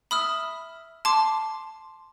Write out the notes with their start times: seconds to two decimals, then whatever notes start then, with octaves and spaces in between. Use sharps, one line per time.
0.11 E5 B5 D#6 F6
1.05 A5 C6 D6